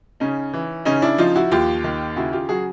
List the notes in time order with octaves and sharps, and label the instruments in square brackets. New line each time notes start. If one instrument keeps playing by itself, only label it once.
[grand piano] C#3 C#4 D#4
E3
C#3 C#4 D#4
D4 E4
F3 D#4 F4
E4 F#4
D#2 F4 G4
D#3
C#3 E4 F#4
F4 G4
F#3 F#4 G#4